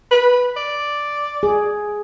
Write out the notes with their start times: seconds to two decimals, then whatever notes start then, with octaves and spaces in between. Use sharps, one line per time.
0.11 B4
0.57 D5
1.43 G#4